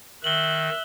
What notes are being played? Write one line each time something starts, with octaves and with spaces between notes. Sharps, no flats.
D#3 E5 F#6 F#7 G7